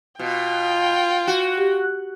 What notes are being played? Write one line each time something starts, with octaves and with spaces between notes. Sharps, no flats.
B2 F4 G5
F#4
G4